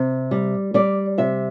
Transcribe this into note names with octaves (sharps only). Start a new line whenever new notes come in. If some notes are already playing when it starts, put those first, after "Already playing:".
Already playing: C3
G3
G3 D5
C3 E5